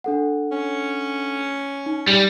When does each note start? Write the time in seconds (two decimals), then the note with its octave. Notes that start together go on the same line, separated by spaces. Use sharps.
0.04 D4 A4 F#5
0.52 C#4
1.86 D#4
2.08 G3